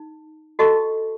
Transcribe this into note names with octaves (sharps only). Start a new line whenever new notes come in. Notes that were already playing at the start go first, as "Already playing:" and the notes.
Already playing: D#4
F#4 A4 D#5 A5 C#6